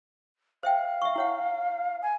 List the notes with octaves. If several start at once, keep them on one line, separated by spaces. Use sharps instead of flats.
C5 E5 F5 G5
E5 C#6
E4 C#5 F#5
G#5